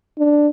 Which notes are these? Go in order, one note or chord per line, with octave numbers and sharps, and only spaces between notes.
D4